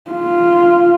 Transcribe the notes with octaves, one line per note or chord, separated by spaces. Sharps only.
F4